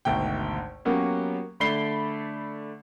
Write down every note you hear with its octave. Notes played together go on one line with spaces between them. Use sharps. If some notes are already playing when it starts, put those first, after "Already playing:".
G#1 D2 B2 G5
F#3 A#3 B3 C#4 G4
D3 A3 D5 B5 C7 G7